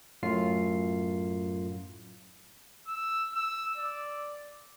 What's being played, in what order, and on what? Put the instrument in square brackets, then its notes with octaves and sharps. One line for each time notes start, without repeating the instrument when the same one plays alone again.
[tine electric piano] F#2 A2 F4 C7
[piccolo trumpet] E6
E6
D5